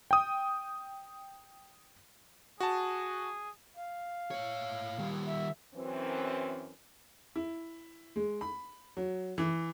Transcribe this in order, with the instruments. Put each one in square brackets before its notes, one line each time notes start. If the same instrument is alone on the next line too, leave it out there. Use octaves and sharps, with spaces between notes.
[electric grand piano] G5 D#6
[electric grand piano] F#4 A5 [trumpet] G#4
[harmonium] F5
[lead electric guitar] A3 C#5
D#3 G3
[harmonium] E5
[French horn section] F#2 E3 C4
[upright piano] E4
G#3
B5
F#3
E3